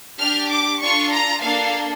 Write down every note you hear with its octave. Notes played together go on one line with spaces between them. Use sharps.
D4 G4 F6
D6
D4 F4 A4 C#6
A#5
A#3 D4 A4 F5